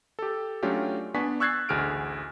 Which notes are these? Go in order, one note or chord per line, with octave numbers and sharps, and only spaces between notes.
G4 A4
F#3 A3 C#4 D4 F4 G4
B3 D4 G#5 C#6 B6
C#6 E6 F#6 G#6 A6 C7
A1 D2 G#4 F6 D7